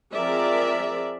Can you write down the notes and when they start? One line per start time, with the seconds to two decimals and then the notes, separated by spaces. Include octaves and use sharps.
0.12 F3 C4 G#4 A#4 D5 E5